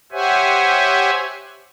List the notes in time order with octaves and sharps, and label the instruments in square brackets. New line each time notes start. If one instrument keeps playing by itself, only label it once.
[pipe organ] G4 C5 C#5 E5 F#5 G#5